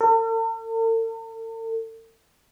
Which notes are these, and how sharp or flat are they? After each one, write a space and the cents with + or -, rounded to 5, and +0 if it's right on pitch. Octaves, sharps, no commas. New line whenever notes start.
A4 +45